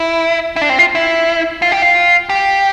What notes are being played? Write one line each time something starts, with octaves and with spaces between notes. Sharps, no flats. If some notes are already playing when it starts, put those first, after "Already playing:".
Already playing: E4
E4
D4
C4
F4
E4
F4
G4
F4
G4